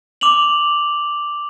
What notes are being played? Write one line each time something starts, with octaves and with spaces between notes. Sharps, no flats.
D6 F7 F#7